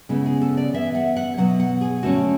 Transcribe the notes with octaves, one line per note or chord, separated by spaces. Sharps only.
C#3 G#3 B3 E4
G#4
A4
D5
E3 B3 E5
F#5
F#5
B2 F#3 B3 F#5
F#5
G#4
D3 A3 C#4 F#4